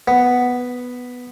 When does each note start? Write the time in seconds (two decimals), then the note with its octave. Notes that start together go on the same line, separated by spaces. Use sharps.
0.08 B3